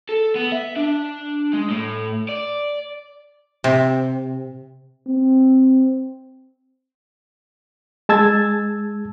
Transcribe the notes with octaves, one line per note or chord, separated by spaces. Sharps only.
A4
B3
E5
D4
G#3
A2
D5
C3
C4
G#3 A5 E6 G#6 A6